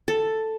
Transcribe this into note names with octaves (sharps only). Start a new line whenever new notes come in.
A4